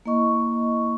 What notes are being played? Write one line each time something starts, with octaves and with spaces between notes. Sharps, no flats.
A#3 E4 D#5 C#6